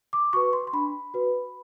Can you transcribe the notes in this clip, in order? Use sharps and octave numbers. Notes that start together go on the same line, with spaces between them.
D6
F#4 B4 C#6
C6
C6
D4 B5
F#4 B4